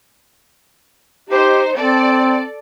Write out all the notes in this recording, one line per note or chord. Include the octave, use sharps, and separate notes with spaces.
D#4 G4 C5
C4 A4 D5